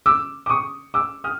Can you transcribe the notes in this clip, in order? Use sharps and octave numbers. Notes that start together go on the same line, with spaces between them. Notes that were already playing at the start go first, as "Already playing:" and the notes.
D6 E6
D6
C#6 D#6
D6 E6
D#6 F6